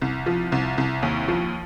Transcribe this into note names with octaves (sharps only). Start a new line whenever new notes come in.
C2
F3
C2
C2
D#2
F3